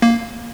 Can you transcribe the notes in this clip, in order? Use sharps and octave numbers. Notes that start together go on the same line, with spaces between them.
A#3